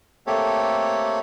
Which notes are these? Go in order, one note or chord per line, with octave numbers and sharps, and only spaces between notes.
A3 A#3 C4 G4 A4 C#5